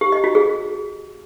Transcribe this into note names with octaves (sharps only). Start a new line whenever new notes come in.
G4
D#5
F#4
G#4